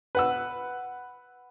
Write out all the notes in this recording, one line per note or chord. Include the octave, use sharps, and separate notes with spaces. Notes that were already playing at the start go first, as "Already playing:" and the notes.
B4 F#5 E6